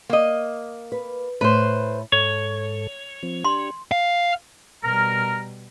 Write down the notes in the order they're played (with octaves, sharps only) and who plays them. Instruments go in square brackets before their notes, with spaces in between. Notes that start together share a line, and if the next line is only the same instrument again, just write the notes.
[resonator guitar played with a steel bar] A#3 D#5
[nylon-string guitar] B4
[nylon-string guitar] A2 [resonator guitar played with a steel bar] B4 C5
[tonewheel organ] G#2 A4 [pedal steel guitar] C#5
[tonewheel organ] F3 C4
[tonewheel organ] D4 G4 [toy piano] C6
[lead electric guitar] F5
[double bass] B2 G3 [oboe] A#4 [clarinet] A#5 [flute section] F6